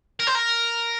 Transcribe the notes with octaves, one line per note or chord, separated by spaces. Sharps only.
A#4
C5
A#4